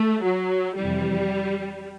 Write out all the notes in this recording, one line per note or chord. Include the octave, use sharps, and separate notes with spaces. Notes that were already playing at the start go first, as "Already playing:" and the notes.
Already playing: A3
F#3
F2 C3 E3 G3